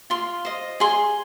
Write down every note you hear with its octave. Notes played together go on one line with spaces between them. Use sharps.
F4 C6
C5 D#5
G#4 C6